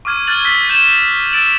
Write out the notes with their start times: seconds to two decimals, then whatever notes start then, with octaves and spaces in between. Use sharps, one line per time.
0.05 C#6 D6 F6 G#6 D#7
0.27 F6 F#6 G#6 A6 D#7 F#7
0.44 E6 F#6 A6 B6 G7
0.69 G6 A6 E7
1.32 E6 A6 D7 E7 F#7